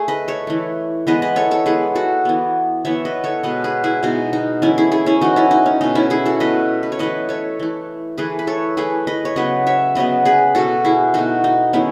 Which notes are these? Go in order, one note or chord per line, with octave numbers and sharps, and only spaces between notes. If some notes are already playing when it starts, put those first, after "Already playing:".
Already playing: A3 G#4
B4 D#5
A4 C#5
E3 A3
E3 G#3 B3 B4 D#5
B4 D#5
A4 C#5
A4 C#5
E3 G#3 B3 G#4 B4
F#4 A4
E3 B3
E3 B3 C#5 E5
B4 D#5
A4 C#5
B2 G#3 B3 B4 D#5
G#4 B4
E4 G#4
B2 G#3 B3 D#4 F#4
D#4
E3 A3 C#4 E4
E4 G#4
E4 G#4
C#4 E4
E3 A3 D#4 F#4
C#4 E4
D#4
C#4
B2 A3 D#4
C#4 E4
E4 G#4
F#4 A4
B2 A3 B4 D#5
B4
C#5
E3 A3 B4 D#5
A4 C#5
E3 A3
E3 A3 G#4 B4
B4
A4 C#5
E3 A3 G#4 B4
B4 D#5
C#5
C#3 F#3 B3 B4 D#5
C#5 E5
C#3 F#3 B3 B4 D#5
G#4 B4
B2 A3 F#4 A4
E4 G#4
B2 A3 D#4 F#4
D#4
D#3 G#3 B3 C#4 E4